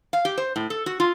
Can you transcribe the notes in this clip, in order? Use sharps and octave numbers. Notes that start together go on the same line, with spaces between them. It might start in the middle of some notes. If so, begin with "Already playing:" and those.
F5
G4
C5
A2
A4
F#4
F4